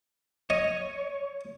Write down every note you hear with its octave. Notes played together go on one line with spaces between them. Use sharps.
C#5 D#5